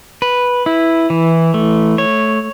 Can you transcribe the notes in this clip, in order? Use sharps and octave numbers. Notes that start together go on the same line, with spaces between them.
B4
E4
E3
A3
C#5